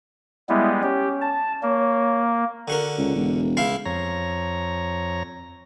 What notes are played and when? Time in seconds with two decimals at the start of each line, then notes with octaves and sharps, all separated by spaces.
0.49 G3 G#3 B3 E4
0.83 C#4 G4
1.21 A5
1.63 A#3 C#5
2.68 D3 F#4 A#4
2.98 C#2
3.15 E1
3.57 C#2 E4 F5
3.86 F2 C#5 A#5